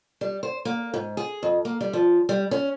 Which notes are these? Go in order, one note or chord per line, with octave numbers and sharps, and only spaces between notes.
G3
C5
A#3
G#2
G#4
F2
A#3
G3
F3
G3
C#4